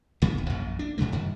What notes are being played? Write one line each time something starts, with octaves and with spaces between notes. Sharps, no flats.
B1 C#3 B3
D#1
A#1 F#2 A#2
D4
A2 C#3 F#3 A3
F#2 D#3 G3